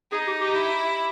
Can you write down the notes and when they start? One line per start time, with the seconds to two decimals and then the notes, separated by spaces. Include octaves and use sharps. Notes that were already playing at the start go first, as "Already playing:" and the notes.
0.12 D#4 G#4
0.27 G4
0.41 G4
0.55 E4